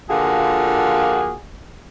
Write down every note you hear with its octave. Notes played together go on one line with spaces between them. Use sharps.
D3 F3 A#3 F4 F#4 G#4